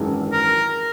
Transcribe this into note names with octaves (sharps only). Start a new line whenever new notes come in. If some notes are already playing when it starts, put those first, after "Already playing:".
Already playing: G#1 F#2 E3 G#3
A#4